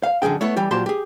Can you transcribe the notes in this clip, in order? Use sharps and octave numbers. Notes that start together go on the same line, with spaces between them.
F5
F#2 D3 E3 G#4 G5
A3 B3 E4 C#5
E3 G3 G4
A#2 F#3 G4 C5 A5 C6
G4 G#4